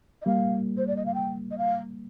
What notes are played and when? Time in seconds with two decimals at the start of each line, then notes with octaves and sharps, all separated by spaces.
0.22 D#5
0.26 G3 A#3 F5
0.77 C5
0.87 D5
0.96 D#5
1.06 F5
1.14 G5
1.51 D#5
1.58 F5